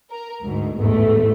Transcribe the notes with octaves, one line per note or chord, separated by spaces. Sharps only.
A#4
D2 G#2
A1 E2 G#2 E3 A3